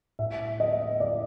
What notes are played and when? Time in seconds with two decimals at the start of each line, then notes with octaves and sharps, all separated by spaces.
0.19 A2 E5
0.60 D#5
1.00 D5